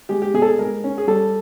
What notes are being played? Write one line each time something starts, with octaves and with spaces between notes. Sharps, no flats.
G#3 G4
G4
B2 G#4
A4
G#4
G#3 A#4
C#4
G#4
G3 A4